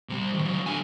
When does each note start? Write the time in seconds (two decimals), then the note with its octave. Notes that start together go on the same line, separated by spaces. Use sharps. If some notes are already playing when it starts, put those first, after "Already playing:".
0.09 C3 G3
0.33 A2 D#3
0.45 F#3 E4
0.66 D3 G#5